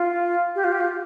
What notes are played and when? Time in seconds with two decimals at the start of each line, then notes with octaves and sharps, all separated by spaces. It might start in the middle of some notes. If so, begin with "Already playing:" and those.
Already playing: F4
0.55 G4
0.64 F4
0.72 G4
0.80 F4